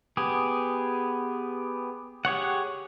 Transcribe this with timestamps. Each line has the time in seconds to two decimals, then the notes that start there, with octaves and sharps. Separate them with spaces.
0.17 B3 G4 G#4
2.25 G4 G#4 C#5 F#5